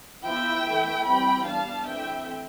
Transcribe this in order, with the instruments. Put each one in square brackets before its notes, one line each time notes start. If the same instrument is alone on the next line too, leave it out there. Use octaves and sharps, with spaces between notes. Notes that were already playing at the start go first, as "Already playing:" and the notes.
[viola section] F3 B3 E4 E5 G5
E3 A3 E4
E3 G3 C4 E4 G5 B5
G3 B3 D4 F5 A5
E3 A3 C4 E5 G5